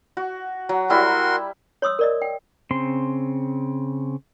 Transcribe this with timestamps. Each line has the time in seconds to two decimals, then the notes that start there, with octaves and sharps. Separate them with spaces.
0.17 F#4
0.69 F#3
0.90 G3 E4 F#4 A#4 C6 E6
1.82 C#5 C6 D#6 E6
1.99 A#4 D5 D#5
2.22 G5
2.71 C#3 C4 C6